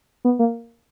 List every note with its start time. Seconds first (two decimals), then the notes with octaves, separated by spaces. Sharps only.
0.25 B3
0.39 A#3